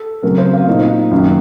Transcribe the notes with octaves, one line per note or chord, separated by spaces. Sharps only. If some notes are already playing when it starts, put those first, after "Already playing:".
Already playing: A4
C#3 F#3 A3 C4 A#4
C5
F5
A#2 A3 D#4
F#2 D#3 A#3